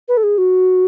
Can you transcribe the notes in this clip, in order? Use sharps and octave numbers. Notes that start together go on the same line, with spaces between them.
B4
A4
G#4
F#4